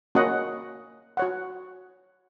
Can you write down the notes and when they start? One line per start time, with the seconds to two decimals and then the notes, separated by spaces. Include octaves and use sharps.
0.15 A#3 C#4 F#4 D#5 F#5
1.17 F#4 C#5 F#5